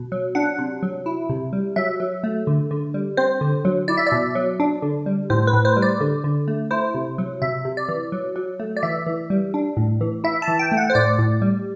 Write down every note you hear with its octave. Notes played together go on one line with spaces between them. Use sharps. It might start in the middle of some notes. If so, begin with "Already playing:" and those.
Already playing: B2
F#3
D4 F#5
C3
F#3
E4
C3
G3
F#3 E5
F#3
A3
D3
D3
G3
C4 C5
D3
F#3
E4 D5
E5
D5
B2
F#3
D4
D3
G3
A2 C5
B4
A2
C5
G3
D5
D3
D3
A3
E4 C5
C3
F#3
C3 E5
C3
D5
E3
F#3
F#3
A3
D5
E3 E5
E3
G3
D4
A2
E3
E4 E5
A5
E3
G5
A3
F#5
C5
A2 D5
A2
G3